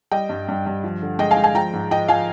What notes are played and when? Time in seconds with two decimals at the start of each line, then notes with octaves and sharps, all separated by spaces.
0.11 G3 D#5 G5
0.29 G2
0.48 G2
0.66 G2
0.84 F3
1.02 D3
1.19 G#3 D#5 G5
1.31 F5 G#5
1.37 G#3
1.44 F5 G#5
1.55 F3 G5 A#5
1.73 G#2
1.91 F3 D#5 G5
2.08 F3 F5 G#5